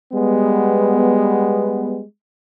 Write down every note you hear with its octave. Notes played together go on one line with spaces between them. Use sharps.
G3 G#3 B3